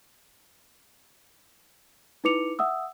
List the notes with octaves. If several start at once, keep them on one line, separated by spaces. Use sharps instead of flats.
D#4 E4 B4 D6 C#7 F7
E5 F#5 D#6 E6